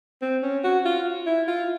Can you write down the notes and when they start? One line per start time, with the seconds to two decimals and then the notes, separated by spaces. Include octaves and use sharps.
0.22 C4
0.43 C#4
0.64 F#4
0.85 F4
1.26 E4
1.48 F4